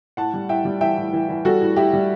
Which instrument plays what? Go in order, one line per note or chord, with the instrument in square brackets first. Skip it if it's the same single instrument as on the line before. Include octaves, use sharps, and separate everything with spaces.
[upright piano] A2 F#5 A5
G3
A2 E5 G5
G3
E3 E5 G5
A2
E3
E3
G3 F#4 A4
A2
A2 E4 G4
G3